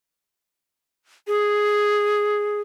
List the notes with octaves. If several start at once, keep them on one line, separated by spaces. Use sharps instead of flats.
G#4